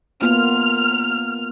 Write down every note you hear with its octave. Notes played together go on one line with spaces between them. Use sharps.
A#3 B3 F4 F6